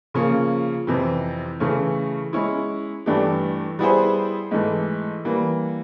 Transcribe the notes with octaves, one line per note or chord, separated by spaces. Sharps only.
C#3 F3 A#3 C#4
F2 C3 E3
C#3 E3 A3 C#4
G#3 C#4 E4
G2 E3 A3 D4 G4
G3 B3 E4 G#4 C5
G#2 E3 A3
E3 G3 A#3